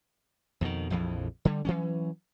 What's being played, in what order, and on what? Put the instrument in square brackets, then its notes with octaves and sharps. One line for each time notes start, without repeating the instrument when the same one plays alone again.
[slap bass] F2 B2 D3 D#3
A#1 F2 E3 F3
D3 G3
E3 F#3 C#4